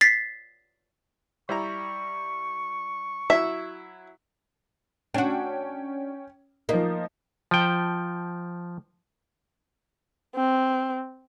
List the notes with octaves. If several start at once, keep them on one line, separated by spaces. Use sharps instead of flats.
A6 B6 C7
G3 E4 A#5 C#6
F#3 E4 E5
C#4 D4 F#4 G5
F3 A#3 D#4
F3 G5
C4